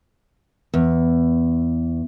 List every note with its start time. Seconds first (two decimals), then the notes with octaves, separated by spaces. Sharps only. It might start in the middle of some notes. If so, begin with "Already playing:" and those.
0.74 E2